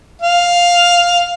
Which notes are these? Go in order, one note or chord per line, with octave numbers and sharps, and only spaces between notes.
F5